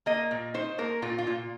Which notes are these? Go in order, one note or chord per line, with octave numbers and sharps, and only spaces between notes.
A#3 D#5
A#2
D#4 C5
A#3 A#4
A#2 F4
F4
A#2